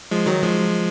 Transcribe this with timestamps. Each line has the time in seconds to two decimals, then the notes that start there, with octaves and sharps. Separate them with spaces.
0.11 F3 G#3
0.26 D#3 F#3
0.42 F3 G#3